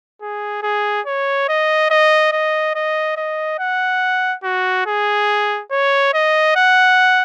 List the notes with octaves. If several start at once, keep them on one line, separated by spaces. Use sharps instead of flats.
G#4
G#4
C#5
D#5
D#5
D#5
D#5
D#5
F#5
F#4
G#4
C#5
D#5
F#5